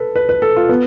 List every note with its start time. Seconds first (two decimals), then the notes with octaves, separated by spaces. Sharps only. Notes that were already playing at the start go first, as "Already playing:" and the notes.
Already playing: A4 B4
0.16 B4
0.29 B4
0.42 A4
0.56 F4
0.69 B3